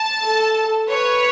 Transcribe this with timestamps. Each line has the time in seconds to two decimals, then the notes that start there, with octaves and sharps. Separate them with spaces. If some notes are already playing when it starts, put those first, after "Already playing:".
Already playing: A5
0.22 A4
0.89 B4 C#5